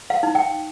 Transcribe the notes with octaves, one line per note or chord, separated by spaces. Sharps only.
F5
D#4
G5